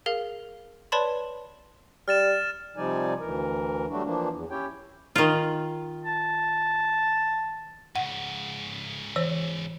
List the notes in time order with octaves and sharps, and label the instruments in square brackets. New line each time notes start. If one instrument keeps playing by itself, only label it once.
[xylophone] G#4 A#4 F5
B4 C#5 D5 A5 B5 C6
[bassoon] G3 [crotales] F6 A6 E7
[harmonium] C3 F3 G3 D#4 D5 G#5
D2 E3 A#4
F#3 G3 A3 D4 F#4
E3 F3 A#3 D4
E2
C#4 E4 G4 C#5 G5
[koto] D#3 F4
[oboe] A5
[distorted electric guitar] G#2 C#3 [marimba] F#5
[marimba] E3 C5 C#5